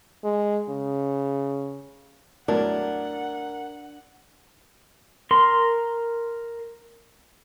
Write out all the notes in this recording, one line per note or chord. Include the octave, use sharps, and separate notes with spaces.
G#3
C#3
E2 A2 F#3 D4 A#4 F#5
A#4 C6